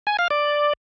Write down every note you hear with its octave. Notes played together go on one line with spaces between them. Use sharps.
G#5
F5
D5